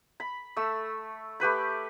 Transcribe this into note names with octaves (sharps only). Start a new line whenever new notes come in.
B5
A3 E6
A3 G4 B4 B5